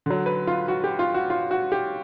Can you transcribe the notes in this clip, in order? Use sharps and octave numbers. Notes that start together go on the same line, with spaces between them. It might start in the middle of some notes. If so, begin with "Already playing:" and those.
D3 F#3
B4
F4
F#4
G4
F4
F#4
F4
F#4
G4